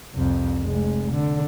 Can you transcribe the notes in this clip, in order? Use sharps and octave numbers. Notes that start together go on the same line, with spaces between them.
C2 F2
F1 G#3
D3